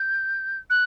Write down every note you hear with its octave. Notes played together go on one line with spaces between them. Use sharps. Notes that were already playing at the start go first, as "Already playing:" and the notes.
Already playing: G6
F#6